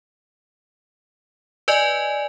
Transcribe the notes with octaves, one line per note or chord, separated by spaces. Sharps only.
B4 D5 D#5 G#5